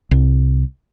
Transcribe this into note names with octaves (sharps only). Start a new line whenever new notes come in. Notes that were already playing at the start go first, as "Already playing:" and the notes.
C2